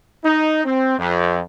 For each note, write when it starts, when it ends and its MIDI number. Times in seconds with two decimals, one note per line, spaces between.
0.25 0.63 63
0.65 0.99 60
0.99 1.41 41